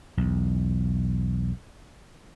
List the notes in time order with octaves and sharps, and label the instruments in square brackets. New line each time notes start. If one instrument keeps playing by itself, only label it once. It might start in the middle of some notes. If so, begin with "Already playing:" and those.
[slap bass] B1 E2